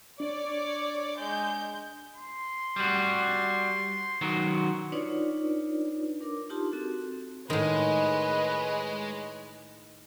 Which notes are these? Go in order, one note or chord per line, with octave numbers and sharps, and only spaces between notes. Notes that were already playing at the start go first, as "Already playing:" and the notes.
D4 C#5 D5
G#3 G6
C6
G3 F#4
D#3 F#3 F#4
D4 D#4 F4 B4 C#5 D5
D4 A#4 D6
D#4 F4 G4 A5 C6
C4 F#4 A4
A2 D#3 G#3 B4 C#5 D#5